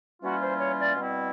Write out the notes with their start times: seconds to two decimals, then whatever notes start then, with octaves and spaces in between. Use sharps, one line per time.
0.21 E3 G3 A#3 C#4 F4 F#4
0.40 C5
0.59 C#5
0.78 D5
0.96 B2 G3 C4 E4